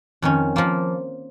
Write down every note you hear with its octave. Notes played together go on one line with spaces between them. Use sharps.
F2 D#3 C#4
F3 A#3 F4